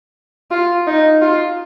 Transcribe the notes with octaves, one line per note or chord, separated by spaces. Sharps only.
F4
D#4
F4